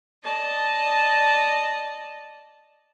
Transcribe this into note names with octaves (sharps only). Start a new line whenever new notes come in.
D5 D#5 A5